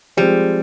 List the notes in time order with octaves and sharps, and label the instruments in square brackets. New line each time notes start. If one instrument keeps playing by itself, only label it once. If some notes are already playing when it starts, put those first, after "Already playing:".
[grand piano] F3 G#3 C4 [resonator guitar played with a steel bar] G3